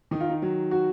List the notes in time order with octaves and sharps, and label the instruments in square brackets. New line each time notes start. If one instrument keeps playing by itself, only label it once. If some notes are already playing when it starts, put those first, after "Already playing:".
[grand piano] D#3 D#4
F4
D#4
F#3
F#4